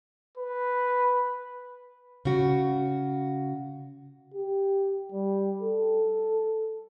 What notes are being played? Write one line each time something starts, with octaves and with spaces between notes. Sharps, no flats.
B4
C#3 F#4
G4
G3
A4